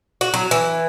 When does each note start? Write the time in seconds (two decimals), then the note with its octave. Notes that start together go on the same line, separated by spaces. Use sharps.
0.21 F#4
0.34 F#3
0.51 E3